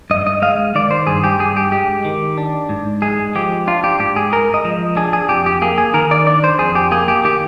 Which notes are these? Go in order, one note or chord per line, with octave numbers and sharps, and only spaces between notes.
G2 D#5
D#5
G#3 F5
D#3 D5
C5
G2 G#4
G4
G2 G#4
G4
G#3 G4
D#3
D4
G#2
G#3 G#4
F3 G4
D4 F4
G4
G#2 G4
G#4
G#3 A#4
D#5
F3
D4 G#4
G#4
F2 G4
G4
A#3 G#4
G#4
D#3 A#4
D5
D4 D5
C5
F2 G#4
G4
A#3 G#4
G4
D#3 G4